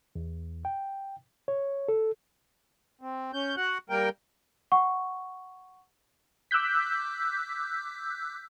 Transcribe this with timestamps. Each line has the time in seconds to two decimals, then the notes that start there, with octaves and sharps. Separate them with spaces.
0.16 E2
0.65 G5
1.48 C#5
1.88 A4
3.01 C4
3.33 C#4 G6
3.57 F#4 F#5 F#6
3.90 G3 A#3 A#4 G5
4.72 F#5 C#6
6.51 D6 E6 F#6 G6 B6